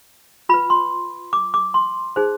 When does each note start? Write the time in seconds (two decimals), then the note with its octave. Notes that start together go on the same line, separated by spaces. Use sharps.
0.49 F4 B4 B5
0.70 C6
1.33 D6
1.54 D6
1.74 C6
2.16 D#4 G#4 C5